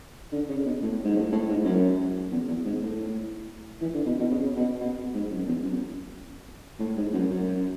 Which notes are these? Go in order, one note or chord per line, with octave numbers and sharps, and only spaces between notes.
D3
C#3
B2
A2
G#2
A2
A2
G#2
F#2
E2
E2
G#2
A2
E3
D3
B2
B2
C#3
B2
B2
G#2
F#2
E2
F#2
A2
G#2
F#2
F#2